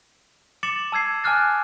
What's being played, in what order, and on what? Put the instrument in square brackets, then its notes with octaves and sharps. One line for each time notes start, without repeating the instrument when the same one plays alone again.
[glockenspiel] D6 A6 C#7 E7 F#7
A5 E6 G#6 C7
G#5 A5 D6 F6 F#6 A6